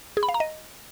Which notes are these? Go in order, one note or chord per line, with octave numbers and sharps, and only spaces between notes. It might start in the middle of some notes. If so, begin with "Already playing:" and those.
G#4
B5
F5
A#5
D#5